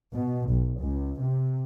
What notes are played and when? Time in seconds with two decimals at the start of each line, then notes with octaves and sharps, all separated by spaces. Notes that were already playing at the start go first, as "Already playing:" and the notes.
0.12 B2
0.49 B1
0.81 C#2
1.20 C3